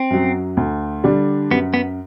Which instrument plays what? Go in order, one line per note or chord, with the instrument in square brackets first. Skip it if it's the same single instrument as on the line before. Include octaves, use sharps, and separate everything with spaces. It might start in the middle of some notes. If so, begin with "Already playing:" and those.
Already playing: [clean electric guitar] C4
[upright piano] F#2 F#3
D2
D3 G3 D4
[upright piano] F#2 [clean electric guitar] B3
[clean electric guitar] B3